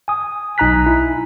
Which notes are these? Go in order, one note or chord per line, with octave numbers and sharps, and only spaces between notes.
G#5 D#6
B1 D#4 G#5 A#5 F#6 B6
E4